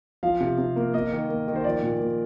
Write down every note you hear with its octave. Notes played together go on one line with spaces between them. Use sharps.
F3 F5
C3
C3
A#3
A#3 D#5
D#3
A#3
D#3
C5
F3 D5
A#2
A#2